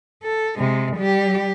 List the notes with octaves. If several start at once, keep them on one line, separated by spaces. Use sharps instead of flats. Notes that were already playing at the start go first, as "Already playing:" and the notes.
A4
C3 G#3
G3 G4